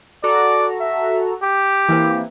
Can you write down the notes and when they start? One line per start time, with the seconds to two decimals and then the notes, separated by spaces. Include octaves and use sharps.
0.24 F#4 A4 D5 A#5
0.81 E5
1.43 G4
1.89 E3 A#3 C4